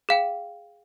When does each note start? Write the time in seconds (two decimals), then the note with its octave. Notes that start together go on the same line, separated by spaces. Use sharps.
0.09 G#4 F5 G5